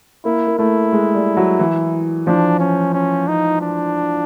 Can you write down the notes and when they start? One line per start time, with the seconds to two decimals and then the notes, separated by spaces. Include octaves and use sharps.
0.24 A#3 E4
0.47 A#3
0.58 A3 E4
0.92 G#3
1.14 G3
1.37 F#3
1.59 E3
2.27 F3 D4
2.60 C#4
2.94 C#4
3.27 D#4
3.61 D4